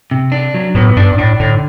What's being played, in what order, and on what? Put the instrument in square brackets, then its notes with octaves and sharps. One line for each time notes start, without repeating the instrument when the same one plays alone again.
[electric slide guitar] C3
D4
F#3
[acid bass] A2 [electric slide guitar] B3
[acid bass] G2 [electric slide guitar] D4
[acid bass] A2 [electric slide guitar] D4
[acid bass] A2 [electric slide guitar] D3